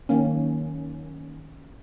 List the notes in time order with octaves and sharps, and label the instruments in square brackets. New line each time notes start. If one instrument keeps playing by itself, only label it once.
[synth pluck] D#3 F#3 A#3 C#4